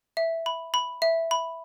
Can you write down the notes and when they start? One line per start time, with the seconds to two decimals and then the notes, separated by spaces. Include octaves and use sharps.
0.17 E5
0.46 B5
0.74 B5
1.02 E5
1.31 B5